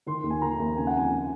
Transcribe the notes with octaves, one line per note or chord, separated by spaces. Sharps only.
D#3 C6
D#2
G#5
D#3 A#5
D#2
C#3 G#5
F#5
F2 G#5
C#3